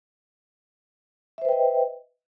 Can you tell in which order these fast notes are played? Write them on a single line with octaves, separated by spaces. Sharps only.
E5 C5 B4 G5 D#5